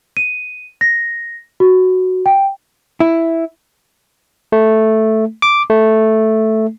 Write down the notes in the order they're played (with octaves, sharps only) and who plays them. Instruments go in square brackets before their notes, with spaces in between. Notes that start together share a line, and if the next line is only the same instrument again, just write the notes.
[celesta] D#7
A#6
F#4
G5
[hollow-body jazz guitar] E4
[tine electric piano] A3
D6
A3